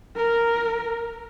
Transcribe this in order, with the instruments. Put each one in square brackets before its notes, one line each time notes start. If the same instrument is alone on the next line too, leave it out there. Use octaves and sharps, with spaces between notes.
[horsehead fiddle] A#4